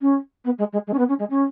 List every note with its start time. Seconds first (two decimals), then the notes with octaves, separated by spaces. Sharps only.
0.01 C#4
0.44 B3
0.58 G#3
0.73 G#3
0.87 G#3
0.93 C#4
0.98 B3
1.08 C#4
1.19 G#3
1.30 C#4